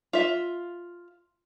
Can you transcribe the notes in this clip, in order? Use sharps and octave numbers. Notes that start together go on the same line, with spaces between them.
F4 E5